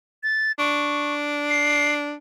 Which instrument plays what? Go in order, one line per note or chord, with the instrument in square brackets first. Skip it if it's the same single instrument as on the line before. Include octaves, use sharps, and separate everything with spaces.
[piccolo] A6
[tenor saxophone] D4 [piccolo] C#6
[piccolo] C7